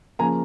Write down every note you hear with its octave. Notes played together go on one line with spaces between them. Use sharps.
C#3 F3 A#3 G#5 A#5